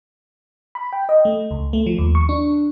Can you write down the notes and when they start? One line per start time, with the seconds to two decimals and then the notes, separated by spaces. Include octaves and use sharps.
0.75 B5
0.93 G5
1.09 D#5
1.25 A3
1.51 C#2
1.73 A3
1.86 F3
1.98 D#2
2.15 C#6
2.29 D4